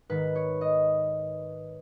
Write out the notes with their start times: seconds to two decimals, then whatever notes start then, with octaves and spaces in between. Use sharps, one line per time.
0.09 G#2 D#3 B4
0.35 C#5
0.61 D#5